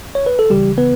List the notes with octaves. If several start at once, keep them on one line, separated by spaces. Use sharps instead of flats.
C#5
B4
A4
C#2 C#3 E3 G3 G4
B3 B4